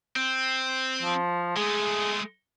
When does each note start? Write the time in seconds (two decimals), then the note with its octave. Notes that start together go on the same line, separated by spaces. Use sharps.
0.16 C4
1.02 F3
1.57 G#3 A3 G#4